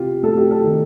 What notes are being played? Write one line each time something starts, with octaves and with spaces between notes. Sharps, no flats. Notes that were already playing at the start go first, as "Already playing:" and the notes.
Already playing: C3 F4 G4
A3 A4
G4
A4
D#3